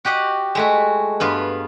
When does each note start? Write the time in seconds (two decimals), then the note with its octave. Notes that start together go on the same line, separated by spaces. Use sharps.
0.05 F#4 G4 D#5 F#5
0.55 G#3 A3 F#4
1.20 G2 B3 F4